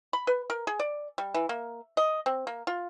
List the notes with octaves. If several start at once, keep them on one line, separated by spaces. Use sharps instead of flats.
B5
B4
A#4
G#4
D5
G3
E3
A#3
D#5
C4
A#3
F4